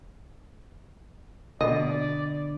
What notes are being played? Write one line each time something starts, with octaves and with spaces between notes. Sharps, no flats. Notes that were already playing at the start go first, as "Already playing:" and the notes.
B2 D3 D5 D#5